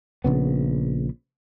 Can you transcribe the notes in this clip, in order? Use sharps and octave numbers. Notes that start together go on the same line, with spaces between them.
A#1 C#3 B3